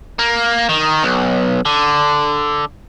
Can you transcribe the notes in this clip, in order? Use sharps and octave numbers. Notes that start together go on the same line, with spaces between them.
A#3
D#3
B1
D3